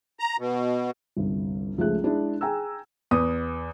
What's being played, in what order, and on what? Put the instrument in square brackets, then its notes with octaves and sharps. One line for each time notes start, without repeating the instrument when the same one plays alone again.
[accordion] A#5
B2
[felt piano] G1 C2
C#2 F3 A3 C#4 G#4 F#6
G#3 D4 E4 G#4
G#4 G5 G#5 A#5 E6
[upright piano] E2 B4 D#6